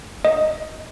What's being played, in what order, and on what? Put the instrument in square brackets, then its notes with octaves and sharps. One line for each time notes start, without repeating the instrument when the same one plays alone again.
[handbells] D#5